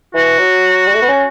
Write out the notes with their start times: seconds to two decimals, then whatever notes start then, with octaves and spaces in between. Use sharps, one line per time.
0.14 E3 F#4
0.39 F#3
0.88 G3
0.94 A3
1.02 B3
1.08 C#4